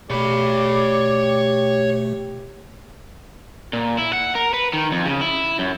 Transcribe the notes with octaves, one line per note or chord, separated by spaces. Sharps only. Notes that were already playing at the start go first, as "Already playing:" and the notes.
B2 A3 G4 C#5 D5 B5
A#2
E4
F#5
A#4
B4
D#3
F2
C#3
E4
F#2